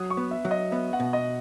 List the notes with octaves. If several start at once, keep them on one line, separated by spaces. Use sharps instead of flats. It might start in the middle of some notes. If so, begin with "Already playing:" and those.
Already playing: F#3 D#6
C#6
B3
E5
F#3
D#5
B3 E5
F#5
B2
D#5